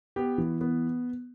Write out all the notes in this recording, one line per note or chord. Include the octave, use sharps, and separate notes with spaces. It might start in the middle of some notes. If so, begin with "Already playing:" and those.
B3 G4
E3
B3